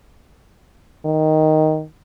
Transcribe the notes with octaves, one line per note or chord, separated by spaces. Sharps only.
D#3